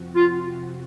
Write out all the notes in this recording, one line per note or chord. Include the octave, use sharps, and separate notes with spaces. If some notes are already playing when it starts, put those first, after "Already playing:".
Already playing: F2 C3 F3 C4 F#4
F4